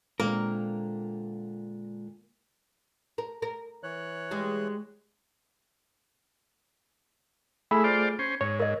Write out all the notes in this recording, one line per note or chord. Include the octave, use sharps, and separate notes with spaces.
A#2 D3 G#3 A#3 C4 A#4
A#4
A#4
E3 C#5 F#6
G3 G#3
A3 E4 G#4 B5
F4 C5 D5
C#4 C5
G#2 C#5
A#4 D#5